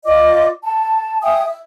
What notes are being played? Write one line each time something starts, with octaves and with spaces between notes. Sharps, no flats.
F4 D5 D#5 D6
A5
E5 G5 G#5 D#6
E5